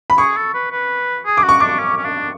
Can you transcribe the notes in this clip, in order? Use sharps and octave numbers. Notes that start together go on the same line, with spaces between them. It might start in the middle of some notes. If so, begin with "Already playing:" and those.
B5
G#4 C#6
A4
B4
B4
G#4
D6
F#4
C#6
D4 D6
C#4
C#4
D4